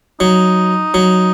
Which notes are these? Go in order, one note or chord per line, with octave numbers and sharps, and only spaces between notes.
F#3 D#4
F#3